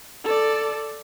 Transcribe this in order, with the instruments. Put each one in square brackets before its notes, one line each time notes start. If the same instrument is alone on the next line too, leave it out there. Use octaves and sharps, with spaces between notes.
[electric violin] A4 D5